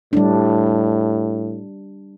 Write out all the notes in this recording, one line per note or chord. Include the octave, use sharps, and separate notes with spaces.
A2 G3 D4